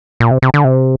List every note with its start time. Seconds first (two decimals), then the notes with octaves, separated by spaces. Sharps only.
0.20 A#2
0.31 C3
0.42 C3
0.54 D3
0.64 C3